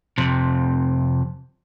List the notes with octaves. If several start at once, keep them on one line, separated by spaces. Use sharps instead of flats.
F2 C3